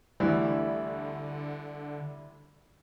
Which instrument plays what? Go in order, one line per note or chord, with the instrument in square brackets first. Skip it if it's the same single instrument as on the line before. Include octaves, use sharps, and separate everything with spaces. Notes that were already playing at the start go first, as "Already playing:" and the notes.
[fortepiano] D2 E3 [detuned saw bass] D3 [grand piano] G3 E4